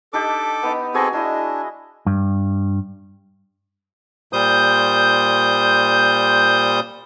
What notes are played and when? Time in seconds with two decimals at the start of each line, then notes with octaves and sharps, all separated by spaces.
0.13 D4 D#4 G4 A4 D6
0.63 B3 D#4
0.94 C4 F#4 G#4 A4 G#5 A#5
1.13 G#3 D4 E4 D#5
2.06 G2
4.33 A#2 G3 C5 D#6 G6